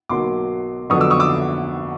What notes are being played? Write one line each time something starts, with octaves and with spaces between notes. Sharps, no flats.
B1 B2 F#3 A#3 C6 D6
F2 D3 F#3 B3 C#6 D#6
D6 E6
C#6 D#6
D6 E6